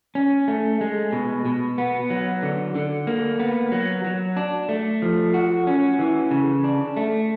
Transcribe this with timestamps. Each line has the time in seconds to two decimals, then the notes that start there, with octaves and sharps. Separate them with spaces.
0.15 C#4
0.48 A3
0.81 G#3
1.13 B2
1.45 B2
1.78 B3
2.10 F#3
2.43 D3
2.75 D3
3.07 A#3
3.40 B3
3.72 F#3
4.04 F#3
4.37 D4
4.69 A3
5.02 F3
5.34 F#4
5.67 C#4
5.99 E3
6.31 C#3
6.64 D4
6.97 A3